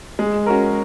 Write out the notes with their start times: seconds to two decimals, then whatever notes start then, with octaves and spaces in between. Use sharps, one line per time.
0.19 G#3
0.46 C#4 F#4 A#4